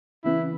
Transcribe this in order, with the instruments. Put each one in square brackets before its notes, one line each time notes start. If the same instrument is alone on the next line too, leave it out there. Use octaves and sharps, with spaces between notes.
[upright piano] C#3 E3 B3 [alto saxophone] E4